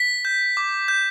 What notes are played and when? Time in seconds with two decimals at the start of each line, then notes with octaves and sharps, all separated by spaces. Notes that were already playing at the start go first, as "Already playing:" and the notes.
Already playing: B6
0.25 G6
0.57 D6
0.88 G6